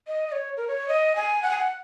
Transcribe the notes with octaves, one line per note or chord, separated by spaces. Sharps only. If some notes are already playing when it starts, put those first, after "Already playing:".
D#5
D#5
C#5
A#4
C#5
D#5
G#5
F#5
G#5
F#5